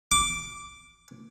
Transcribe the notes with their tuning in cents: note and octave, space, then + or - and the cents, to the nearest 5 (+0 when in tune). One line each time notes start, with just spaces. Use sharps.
D6 -5